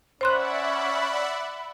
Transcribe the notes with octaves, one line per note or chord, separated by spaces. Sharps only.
C#4 C5 D5 E5 F#5 B5 C6 F#6